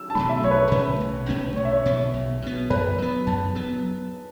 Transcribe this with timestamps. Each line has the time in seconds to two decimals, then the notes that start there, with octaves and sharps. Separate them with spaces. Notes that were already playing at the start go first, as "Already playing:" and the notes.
Already playing: E6
0.10 A5
0.15 B2 F#3 A3 B5
0.29 E5
0.43 B1 C#5
0.51 B4
0.69 B2 A3 C#4 B4
1.00 B1
1.29 B2 A3 C#4
1.56 B1 C#5
1.65 E5
1.73 C#5
1.86 B2 B3
2.13 B1
2.42 B2 B3
2.70 F#2 B4
2.98 F#3 B3
3.26 F#2 A5
3.55 F#3 B3